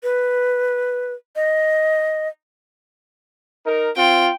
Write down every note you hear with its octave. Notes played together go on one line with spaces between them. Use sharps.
B4
D#5
D#4 A#4
C4 F4 G5